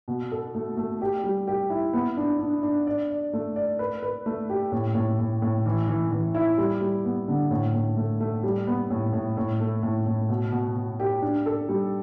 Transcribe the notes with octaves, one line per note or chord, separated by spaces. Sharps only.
B2
A4
A3
A3
G4
G3
G4
E4
B3
D4
D4
D4
D5
D5
A3
D5
B4
B4
A3
G4
A2
A2
A2
A2
E3
E3
E3
E4
G3
G3
B3
D3
A2
A2
A3
A3
G3
B3
A2
A2
A2
A3
A2
A2
B2
B2
B2
G4
D4
A4
G3